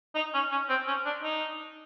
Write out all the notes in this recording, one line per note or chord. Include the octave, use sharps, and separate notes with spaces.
D#4
C#4
C#4
C4
C#4
D4
D#4